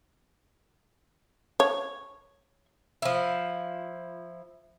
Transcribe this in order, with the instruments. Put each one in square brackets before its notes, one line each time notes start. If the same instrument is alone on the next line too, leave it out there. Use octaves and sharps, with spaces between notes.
[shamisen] C#5
[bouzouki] F3 E4